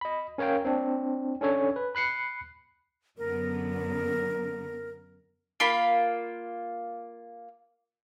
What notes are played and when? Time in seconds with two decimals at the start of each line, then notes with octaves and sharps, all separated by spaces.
0.01 D#5 B5
0.38 C#4 A#4 C#5 F5 G5
0.65 C4 D4
1.41 C#4 D4 A4 C#5
1.76 B4
1.95 B5 F#6 C7 C#7
3.18 F#2 D3 B3 A#4
5.60 A#3 F4 B5